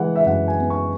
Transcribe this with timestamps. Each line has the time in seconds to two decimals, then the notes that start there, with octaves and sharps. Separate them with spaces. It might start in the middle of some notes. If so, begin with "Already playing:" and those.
Already playing: E3 G#3 F#5
0.16 E5
0.26 F#2 F#5
0.48 G#5
0.59 B3
0.70 C#6